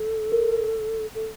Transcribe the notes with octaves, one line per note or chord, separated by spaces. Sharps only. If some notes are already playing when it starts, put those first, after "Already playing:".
Already playing: A4
A#4
A4